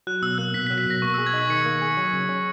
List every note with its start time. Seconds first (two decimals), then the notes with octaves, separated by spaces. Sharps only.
0.07 F#3 F#6
0.22 B2 E6
0.38 A#3 F#6
0.54 B2 B6
0.67 B6
0.70 F#3
0.78 B6
0.86 B2 A#6
1.02 A#3 C#6
1.14 E6
1.18 G#4
1.26 G#6
1.33 D#4 B6
1.50 D#3 C#7
1.65 A#3
1.82 G#4
1.97 F#3
2.13 C#3
2.29 C#4